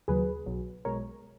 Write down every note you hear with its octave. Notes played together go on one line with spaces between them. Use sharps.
D#2 C#3 F#3 G#4 B4
B1 B2 F#3
B1 B2 G#3 A#4 C#5